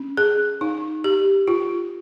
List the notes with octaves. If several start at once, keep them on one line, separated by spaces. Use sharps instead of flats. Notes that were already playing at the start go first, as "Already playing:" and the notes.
Already playing: C#4
G#4
D#4
G4
F4